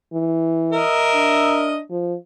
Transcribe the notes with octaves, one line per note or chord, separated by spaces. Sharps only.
E3
A#4 D#5 E5
D4
F3